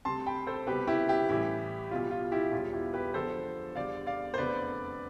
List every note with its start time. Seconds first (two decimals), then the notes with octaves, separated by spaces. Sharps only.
0.05 D2 C3 G3 A5 C6
0.26 G5 B5
0.47 A4 C5
0.67 C2 B2 G3 G4 B4
0.87 E4 G4
1.09 E4 G4
1.29 A1 A2 E3 G3 E4 G4
1.91 B1 B2 G3 F4
2.11 F4
2.32 E4 G4
2.52 E1 E2 B2 G3 F4
2.73 E4 G4
2.94 G4 B4
3.14 E2 D3 F3 A4 C5
3.75 E2 D3 G3 D5 F5
4.07 D5 F5
4.34 C5
4.38 F1 E2 D3 B4 D5